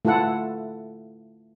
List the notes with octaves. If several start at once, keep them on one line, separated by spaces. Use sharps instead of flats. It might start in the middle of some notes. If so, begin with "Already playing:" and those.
A3 E4 F4 A4 F#5